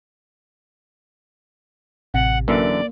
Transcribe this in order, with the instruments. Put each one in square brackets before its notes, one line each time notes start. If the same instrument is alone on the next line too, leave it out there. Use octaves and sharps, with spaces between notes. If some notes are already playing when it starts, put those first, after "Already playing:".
[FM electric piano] A1 C3 [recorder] F#5
[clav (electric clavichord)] F#2 D3 E3 [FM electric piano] A#3 [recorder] D5